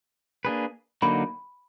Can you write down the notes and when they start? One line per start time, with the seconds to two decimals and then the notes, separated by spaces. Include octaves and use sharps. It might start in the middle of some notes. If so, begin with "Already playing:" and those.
0.45 A#3 D4 G#4 B4
1.02 D3 F#3 A#3 D#4 B5